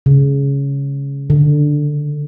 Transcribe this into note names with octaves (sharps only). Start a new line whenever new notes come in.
C#3
D3